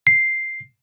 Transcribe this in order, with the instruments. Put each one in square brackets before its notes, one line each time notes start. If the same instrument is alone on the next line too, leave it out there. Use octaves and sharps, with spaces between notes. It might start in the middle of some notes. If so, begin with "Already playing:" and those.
[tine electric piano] C7